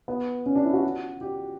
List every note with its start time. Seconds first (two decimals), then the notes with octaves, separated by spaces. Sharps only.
0.08 B3
0.46 C#4
0.55 D4
0.65 E4
0.73 F#4
1.21 G4